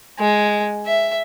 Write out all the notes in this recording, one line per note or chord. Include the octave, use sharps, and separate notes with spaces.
G#3
E5